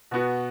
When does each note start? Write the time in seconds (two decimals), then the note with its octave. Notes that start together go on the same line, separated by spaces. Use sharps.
0.11 B2 B3 F#4